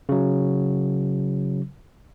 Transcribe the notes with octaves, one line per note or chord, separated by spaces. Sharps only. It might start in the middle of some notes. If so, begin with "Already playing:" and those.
C#3 F#3